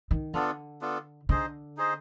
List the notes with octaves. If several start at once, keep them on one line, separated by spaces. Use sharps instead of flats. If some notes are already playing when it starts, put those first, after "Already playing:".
D#3
D3 B3 D4 F4 A4
B3 D4 F4 A4
D3 D#4 G#4 C5 D#5
D#4 G#4 C5 D#5